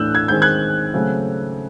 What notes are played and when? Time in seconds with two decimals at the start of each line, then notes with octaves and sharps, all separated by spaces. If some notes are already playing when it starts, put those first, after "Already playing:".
Already playing: A2 E3 A3 D4 E6 F#6 G6
0.15 G#6
0.28 D#3 G#3 C4 G6
0.42 F#6 G#6
0.93 C#3 F#3 A3 C4